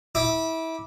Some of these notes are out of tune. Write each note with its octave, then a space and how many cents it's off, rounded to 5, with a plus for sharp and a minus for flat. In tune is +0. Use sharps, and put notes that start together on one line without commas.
E4 -25 D6 +0